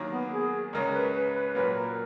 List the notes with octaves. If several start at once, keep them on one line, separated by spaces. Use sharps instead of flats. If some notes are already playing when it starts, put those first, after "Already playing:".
Already playing: D#2 D#3 F#3 A#3
B3
G#4
C#2 C#3 G#3 C#4 A#4
B4
B4
B4
A#2 F#3 A#3 B4
A#4